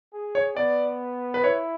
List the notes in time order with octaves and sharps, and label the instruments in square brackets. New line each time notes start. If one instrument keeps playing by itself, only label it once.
[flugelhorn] G#4
[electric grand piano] C#5
[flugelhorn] B3 [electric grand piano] D5
[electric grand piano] B4
[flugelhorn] E4 [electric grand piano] C#5